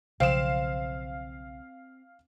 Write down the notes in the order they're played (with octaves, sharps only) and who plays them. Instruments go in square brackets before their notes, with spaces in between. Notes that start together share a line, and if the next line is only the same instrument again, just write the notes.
[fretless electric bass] B1 C#3 F3 [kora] C4 [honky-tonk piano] F5 E7